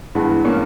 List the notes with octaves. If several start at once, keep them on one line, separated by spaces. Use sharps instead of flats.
G2 E3 G#3 B3
A#3 C#4